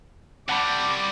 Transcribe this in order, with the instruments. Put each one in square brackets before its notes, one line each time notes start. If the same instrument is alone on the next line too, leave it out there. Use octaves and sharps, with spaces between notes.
[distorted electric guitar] C3 G3 [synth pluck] F#5 A5 B5 [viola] D6